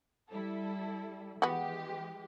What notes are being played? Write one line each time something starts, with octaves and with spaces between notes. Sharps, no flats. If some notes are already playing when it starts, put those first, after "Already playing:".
G3 E4 A4
E3 G#3 B3 F#4 G4